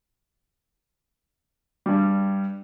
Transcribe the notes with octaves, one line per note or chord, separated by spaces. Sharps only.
G2 G3